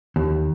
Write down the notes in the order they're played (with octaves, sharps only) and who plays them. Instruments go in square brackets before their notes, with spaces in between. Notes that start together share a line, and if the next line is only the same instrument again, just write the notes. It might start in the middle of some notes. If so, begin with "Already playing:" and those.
[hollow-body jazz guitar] D#2